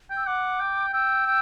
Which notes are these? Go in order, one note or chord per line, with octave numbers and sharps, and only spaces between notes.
G5
E6
F#5 D6
G5
G5 E6
G5